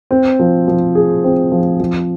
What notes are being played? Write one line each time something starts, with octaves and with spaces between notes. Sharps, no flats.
C4
F3
F3
G#4
C4
F3
F3